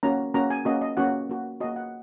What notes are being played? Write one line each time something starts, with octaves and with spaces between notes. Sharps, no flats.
A#3 C#4 F#4 A#5
A#3 C#4 F#4 A#5
G#5
A#3 C#4 F#4 D#5
D#5
A#3 C#4 F#4 F#5
A#3 F#4
A#3 F#4 D#5
F#5